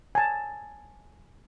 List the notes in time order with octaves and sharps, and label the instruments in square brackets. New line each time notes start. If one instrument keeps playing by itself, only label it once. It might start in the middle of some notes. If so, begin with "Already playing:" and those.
[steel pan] G#5 A5